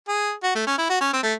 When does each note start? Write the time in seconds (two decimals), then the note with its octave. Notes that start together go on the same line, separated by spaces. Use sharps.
0.08 G#4
0.43 F#4
0.55 A3
0.67 C#4
0.78 E4
0.90 F#4
1.01 C#4
1.13 C4
1.23 A3